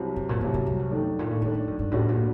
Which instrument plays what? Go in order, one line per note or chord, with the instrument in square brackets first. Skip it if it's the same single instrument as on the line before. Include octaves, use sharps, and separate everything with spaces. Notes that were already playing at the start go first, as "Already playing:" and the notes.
Already playing: [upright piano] C2 C3 F#3
[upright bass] F#2
A#2
[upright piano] C2 C3 F#3 [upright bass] A2
[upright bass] G2
G2
F#2
[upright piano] D#3 A3 D4
[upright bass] A#2
A2
[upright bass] G2 [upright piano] D#3 A3 D4
[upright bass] G2
F#2
G2
[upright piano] D2 D3 G3 D4 F#4 [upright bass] A2
[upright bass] A#2